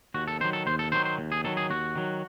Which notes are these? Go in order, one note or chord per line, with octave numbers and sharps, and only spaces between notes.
D#2 F#4
A4
D#3 F#3 C5
A4
D#2 C5
A4
D#3 F#3 C5
C5
D#2
G#4
D#3 F#3 A4
G#4
D#2 F#4
D#3 F#3